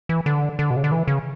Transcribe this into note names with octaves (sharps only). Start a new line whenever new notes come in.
E3
D3
D3
B2
C#3
D3
E3
C#3